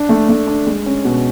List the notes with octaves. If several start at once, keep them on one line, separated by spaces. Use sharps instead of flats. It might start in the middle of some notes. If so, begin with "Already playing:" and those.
Already playing: D4
A3
A3
D4
G#3
C#4
B2